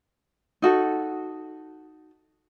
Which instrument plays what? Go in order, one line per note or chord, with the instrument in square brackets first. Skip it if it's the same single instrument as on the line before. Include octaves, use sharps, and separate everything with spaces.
[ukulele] D#4 F#4 A4